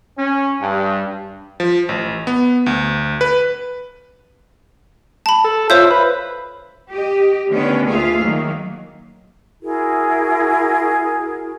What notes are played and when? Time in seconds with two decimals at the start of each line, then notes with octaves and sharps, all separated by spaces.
0.17 C#4
0.60 G2
1.60 F3
1.89 A1
2.27 B3
2.66 D2
3.21 B4
5.26 A5 B5
5.44 A4
5.70 F4 C5 C#5 E5 G6
5.91 B4
6.92 G4 D#5
7.50 D3 D#3 A3 B3 C#4 D4
7.87 D2 A#3 F4 G#4 E5 F5
8.19 D#3 F#3 A#3
9.62 E4 F#4 G#4 A#4